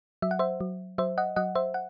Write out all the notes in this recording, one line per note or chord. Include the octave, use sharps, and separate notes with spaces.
F#3 E5
F#5
C5 E5
F#3
F#3 C5 E5
D#5 F#5
F#3 D#5 F#5
C5 E5
F#5